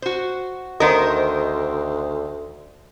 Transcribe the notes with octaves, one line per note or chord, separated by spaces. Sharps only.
F#4 C5
D2 D#3 A#4 C5 D#5